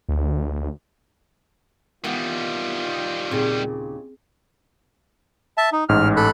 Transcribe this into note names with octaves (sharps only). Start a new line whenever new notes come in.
D2
D#3 E3 G3 B3 F4
D#2 A#2 C#3 C4 G#4
E5 A5
D#4
A1 G#2 F6
A4 B5 F#6